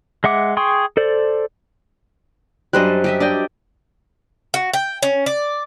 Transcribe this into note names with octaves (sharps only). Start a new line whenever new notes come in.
G#3 E5 F#5 D6
G#4 G5 C6 C#6
A4 C5 D5
F#2 G3 D4 C5 D#5 F#6
G4 D#5 E5
D4 D5 D#5 G5
F#4
G5
C#4
D5